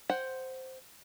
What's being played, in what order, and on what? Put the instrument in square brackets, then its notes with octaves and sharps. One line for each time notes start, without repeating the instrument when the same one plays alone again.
[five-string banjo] C5 F#5 G5